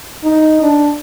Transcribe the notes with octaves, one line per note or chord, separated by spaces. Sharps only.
D#4
D4